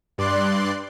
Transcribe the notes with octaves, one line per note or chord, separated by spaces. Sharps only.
G2 D5 C6 F#6